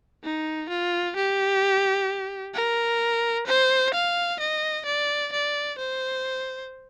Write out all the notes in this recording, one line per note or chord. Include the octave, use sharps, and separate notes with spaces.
D#4
F4
G4
A#4
C5
F5
D#5
D5
D5
C5